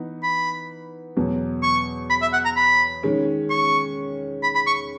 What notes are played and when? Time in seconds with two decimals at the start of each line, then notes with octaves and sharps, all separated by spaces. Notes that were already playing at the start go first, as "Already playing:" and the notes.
Already playing: E3 B3 D#4
0.23 B5
1.17 E2 B2 F#3
1.63 C#6
2.10 B5
2.22 E5
2.33 F#5
2.45 A#5
2.56 B5
3.03 D#3 G#3 C#4
3.50 C#6
4.43 B5
4.55 B5
4.67 C#6